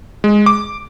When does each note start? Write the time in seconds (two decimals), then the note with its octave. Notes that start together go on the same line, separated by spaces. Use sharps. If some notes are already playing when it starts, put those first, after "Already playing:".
0.24 G#3
0.46 D6